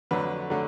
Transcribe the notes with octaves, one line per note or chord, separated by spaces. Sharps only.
F2 D3 F#3 A3 B4
D3 F#3 A3